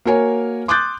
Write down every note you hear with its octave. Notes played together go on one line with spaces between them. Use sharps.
A#3 F#4 A#4 C#5 G#5
C6 D6 D#6 F#6 G6 A6